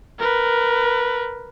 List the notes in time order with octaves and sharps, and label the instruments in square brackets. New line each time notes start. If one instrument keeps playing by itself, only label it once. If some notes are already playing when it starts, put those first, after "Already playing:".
[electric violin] A#4 B4